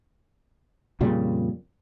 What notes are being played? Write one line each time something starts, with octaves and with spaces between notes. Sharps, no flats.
F2 A#2 C#3 G3